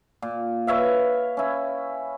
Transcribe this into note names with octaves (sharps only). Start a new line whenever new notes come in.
A#2
B4 C#5 E5 F5
C#4 E4